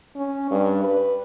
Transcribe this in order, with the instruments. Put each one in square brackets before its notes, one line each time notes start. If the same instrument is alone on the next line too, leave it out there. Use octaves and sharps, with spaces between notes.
[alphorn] C#4
G2
B4